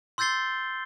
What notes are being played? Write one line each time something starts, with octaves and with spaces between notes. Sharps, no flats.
C6 E6 G6 A6 C7 G7